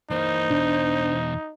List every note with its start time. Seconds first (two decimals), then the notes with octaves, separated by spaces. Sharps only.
0.11 E3 A#3 D#4 C5
0.50 E2 B2 D4